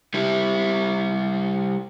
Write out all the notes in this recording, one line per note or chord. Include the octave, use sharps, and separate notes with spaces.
G3 E4